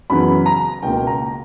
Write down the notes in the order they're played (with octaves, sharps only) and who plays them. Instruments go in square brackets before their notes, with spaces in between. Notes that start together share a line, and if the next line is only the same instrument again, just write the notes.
[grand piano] F#2 C#3 E3 B3 B5
A#5
C#2 B2 A#3 G5
A#5